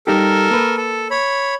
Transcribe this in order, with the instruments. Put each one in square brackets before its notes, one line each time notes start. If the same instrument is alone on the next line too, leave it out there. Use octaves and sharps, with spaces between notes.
[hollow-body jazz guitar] G3 D#4 G4 [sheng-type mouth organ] A4 A#4
[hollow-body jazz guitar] A#3 B4
[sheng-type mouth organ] A4
C#5 B5